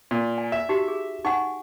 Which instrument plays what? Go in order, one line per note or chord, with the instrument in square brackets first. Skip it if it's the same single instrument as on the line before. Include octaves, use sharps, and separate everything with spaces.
[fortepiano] A#2
[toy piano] G#5
[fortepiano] E5
[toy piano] D#4 F#4 G4
G#4
[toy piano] D#4 F#5 G#5 [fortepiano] C#6